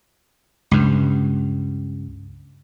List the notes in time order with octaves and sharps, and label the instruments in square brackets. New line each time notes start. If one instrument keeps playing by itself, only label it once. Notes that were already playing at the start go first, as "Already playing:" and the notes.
[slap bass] C#2 G2